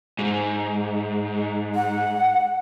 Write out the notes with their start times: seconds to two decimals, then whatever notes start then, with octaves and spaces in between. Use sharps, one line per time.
0.19 G#2
1.75 F#5